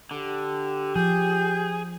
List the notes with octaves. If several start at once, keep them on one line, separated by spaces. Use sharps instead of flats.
D3 G4
F3 G#4 G6